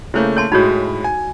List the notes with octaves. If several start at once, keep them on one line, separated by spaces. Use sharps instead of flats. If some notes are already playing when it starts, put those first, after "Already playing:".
C#3 A3 A#3 E4 C5 C#5
C#5 A5 C6
A2 G#3 D#4 F#4 C#5 B5
G#5